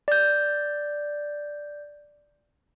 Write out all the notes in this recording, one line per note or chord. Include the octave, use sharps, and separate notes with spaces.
D5 G6